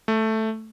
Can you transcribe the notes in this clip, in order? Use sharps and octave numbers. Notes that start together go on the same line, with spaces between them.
A3